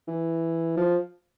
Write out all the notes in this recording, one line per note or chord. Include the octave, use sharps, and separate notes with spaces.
E3
F3